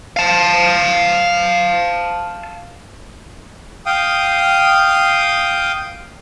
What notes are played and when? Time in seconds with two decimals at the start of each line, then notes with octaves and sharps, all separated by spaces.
0.17 F5 A5
3.86 F5 G5 D#6